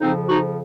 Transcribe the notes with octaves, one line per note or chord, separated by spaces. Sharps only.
F2 C#3 F3 C4 D#4
D#4 F#4